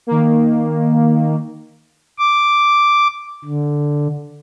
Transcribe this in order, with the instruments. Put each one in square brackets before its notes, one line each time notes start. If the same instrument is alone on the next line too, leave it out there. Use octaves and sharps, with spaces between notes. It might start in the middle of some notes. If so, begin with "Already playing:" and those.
[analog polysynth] D#3 A#3
[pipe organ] D6
D3